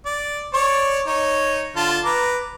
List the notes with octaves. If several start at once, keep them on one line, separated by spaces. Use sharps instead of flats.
D5
C#5 D5 C#6
D#4 C#5
D3 F4 A5
B4 A#5 D6